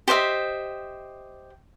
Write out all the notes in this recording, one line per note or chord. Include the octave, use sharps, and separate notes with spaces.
G4 C5 D#5 E5